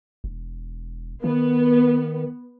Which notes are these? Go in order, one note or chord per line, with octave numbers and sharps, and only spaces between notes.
E1
D#3 B3